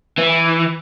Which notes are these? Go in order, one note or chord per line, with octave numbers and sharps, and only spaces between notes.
E3